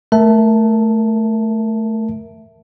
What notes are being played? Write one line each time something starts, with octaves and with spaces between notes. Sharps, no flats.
A3 A#4 E5 A5